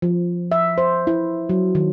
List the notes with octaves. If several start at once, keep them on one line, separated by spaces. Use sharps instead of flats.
F3
E5
C5
E4
F#3
D#3